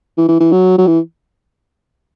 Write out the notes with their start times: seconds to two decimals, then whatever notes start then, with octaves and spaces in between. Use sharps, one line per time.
0.17 E3
0.28 E3
0.40 E3
0.52 F#3
0.78 F#3
0.87 E3